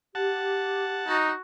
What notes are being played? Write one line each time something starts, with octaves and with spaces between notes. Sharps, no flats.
G4 F#5 A5
D#4 F#4